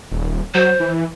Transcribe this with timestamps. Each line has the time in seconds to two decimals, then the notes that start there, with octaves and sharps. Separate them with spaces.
0.11 D#1
0.55 F#3 C5
0.80 E3